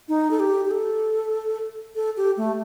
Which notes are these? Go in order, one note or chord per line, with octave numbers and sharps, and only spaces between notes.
D#4
A4
G4
G4
A4
A4
G4
A3